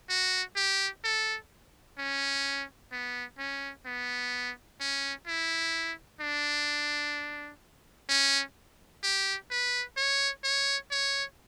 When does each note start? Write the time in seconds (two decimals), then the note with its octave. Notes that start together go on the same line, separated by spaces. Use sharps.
0.09 F#4
0.56 G4
1.04 A4
1.98 C#4
2.92 B3
3.38 C#4
3.86 B3
4.80 C#4
5.27 E4
6.21 D4
8.09 C#4
9.03 G4
9.51 B4
9.97 C#5
10.44 C#5
10.91 C#5